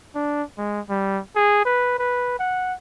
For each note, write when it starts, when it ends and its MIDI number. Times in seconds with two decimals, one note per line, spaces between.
0.15 0.43 62
0.58 0.80 56
0.90 1.19 55
1.36 1.61 68
1.66 1.96 71
1.99 2.35 71
2.39 2.74 78